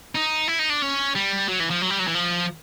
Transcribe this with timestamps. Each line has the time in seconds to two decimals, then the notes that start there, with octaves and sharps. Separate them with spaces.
0.15 D#4
0.48 E4
0.59 D#4
0.70 D4
0.82 C#4
1.15 G3
1.48 F#3
1.60 E3
1.70 F3
1.82 F#3
1.90 G3
1.99 F#3
2.08 E3
2.15 F3